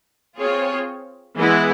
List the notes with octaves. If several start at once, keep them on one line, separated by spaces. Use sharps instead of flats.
C4 F4 G#4 C#5
E3 G#3 B3 E4